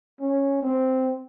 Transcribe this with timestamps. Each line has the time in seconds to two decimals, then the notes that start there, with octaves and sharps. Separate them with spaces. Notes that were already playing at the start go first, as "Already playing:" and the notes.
0.20 C#4
0.62 C4